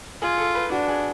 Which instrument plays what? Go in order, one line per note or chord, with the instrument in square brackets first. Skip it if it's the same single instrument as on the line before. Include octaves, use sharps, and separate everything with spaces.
[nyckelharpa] F4 [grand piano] G#4
[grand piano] A4
B4
[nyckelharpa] D4 [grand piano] F#4
[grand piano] G#4